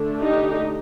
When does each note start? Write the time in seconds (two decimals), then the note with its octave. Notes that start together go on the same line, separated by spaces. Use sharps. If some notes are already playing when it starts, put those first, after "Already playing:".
Already playing: D3 A3 D4
0.20 D#4 G4